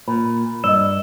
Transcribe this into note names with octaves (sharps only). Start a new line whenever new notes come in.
A#2 B5
G2 D5 D#5 E6 E7